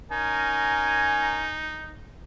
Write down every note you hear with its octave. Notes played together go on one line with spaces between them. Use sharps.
C#4 D#4 A#4 G#5